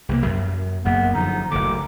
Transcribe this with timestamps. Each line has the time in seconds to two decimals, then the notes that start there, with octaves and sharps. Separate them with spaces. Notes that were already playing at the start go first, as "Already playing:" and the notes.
0.09 C2 G3 A#3
0.26 F#2
0.85 F#1 F#2 A#3 B3
1.14 F#2 D3 F3 D#4
1.51 F#1 D2 D3 D6